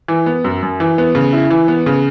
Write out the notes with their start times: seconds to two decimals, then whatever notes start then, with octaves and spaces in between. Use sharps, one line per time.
0.08 E3
0.26 B3
0.44 F#2
0.63 F#2
0.80 E3
0.98 B3
1.15 C#3
1.33 E4
1.50 E3
1.68 B3
1.86 C#3